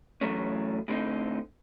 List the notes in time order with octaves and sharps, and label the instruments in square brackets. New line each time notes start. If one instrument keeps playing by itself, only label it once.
[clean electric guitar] A2 E3 F#3 A3 C#4
A2 D3 C4 D#4